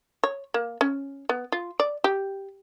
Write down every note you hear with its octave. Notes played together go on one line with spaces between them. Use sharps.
C#5
A#3
C#4
B3
F4
D5
G4